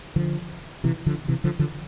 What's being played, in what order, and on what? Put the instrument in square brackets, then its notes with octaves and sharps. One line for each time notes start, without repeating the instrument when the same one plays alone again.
[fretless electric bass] D3 F3
C3 E3
D3 F3
C3 E3
D3 F3
D3 F3